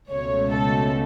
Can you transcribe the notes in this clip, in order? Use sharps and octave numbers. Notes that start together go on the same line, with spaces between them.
C#2 B2 A3 C#5
A4